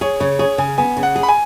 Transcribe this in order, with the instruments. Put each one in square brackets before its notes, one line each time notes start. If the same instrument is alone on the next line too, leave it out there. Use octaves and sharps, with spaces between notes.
[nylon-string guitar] G#4 [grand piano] C#5
[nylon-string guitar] C#3 [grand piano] C#5
[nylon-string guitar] G#4 [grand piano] C#5
[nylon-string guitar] C#3 [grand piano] G#5
[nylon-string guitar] B3 [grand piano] G#5
[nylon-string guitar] C#3
[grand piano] F#5
[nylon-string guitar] G#4
[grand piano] B5
G#5